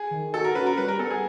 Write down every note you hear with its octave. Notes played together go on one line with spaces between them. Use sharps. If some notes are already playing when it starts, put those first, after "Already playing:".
Already playing: G#4
D#3
F#4 A4
A#4
C#4 B4
A#4
G3 B4
A#4
B3 A4
G#4